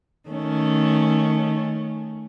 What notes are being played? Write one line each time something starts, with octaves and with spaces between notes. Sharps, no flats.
D#3 A3 C#4